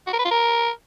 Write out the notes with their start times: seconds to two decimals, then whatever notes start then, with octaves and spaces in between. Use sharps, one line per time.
0.07 F#4
0.13 A#4
0.19 B4
0.25 F4
0.31 A#4